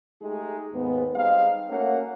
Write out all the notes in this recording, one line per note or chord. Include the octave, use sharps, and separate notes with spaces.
G#3 A3 D#4 G4 G#4
D#2 G#2 G#3 B3
G3 C4 D#4 G#4 F5
A3 A#3 C#4 F#4 C#5 F#5